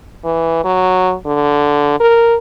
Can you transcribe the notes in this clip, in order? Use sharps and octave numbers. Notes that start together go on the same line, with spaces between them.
E3
F#3
D3
A#4